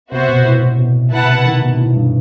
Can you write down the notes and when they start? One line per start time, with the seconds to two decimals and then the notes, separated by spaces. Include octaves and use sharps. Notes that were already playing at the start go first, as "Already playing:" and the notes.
0.12 C3 B3 F#4 C5 E5
0.29 B2
0.45 A2
0.62 A2
0.78 B2
1.12 B2 E4 B4 F#5 A5
1.28 C3
1.45 D#3
1.62 B2
1.75 B2
1.79 A2
1.95 G2